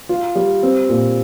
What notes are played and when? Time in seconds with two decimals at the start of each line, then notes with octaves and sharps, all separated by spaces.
0.09 F4
0.35 G3
0.63 C4
0.89 A#2